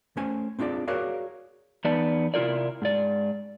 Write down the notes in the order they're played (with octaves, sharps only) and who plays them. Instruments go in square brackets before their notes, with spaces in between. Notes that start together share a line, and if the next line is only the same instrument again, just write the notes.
[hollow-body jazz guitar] A3 C#4 C5 G#5
C4 D4 F4 G#4 D5
F#4 G#4 A#4 C#5 D5 F5
[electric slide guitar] E2 B3 D#4 D5 A5
C3 E4 F4 A#4 D5
G#2 D5